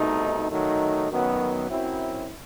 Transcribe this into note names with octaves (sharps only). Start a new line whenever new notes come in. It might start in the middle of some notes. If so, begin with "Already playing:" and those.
Already playing: C2 B2 A3 D#4
D#3 F#3 A3 D#4
F#2 D#3 F#3 B3
F#2 F#3 C4 E4